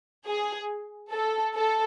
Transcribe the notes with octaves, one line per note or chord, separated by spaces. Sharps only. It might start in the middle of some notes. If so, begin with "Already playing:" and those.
G#4
A4
A4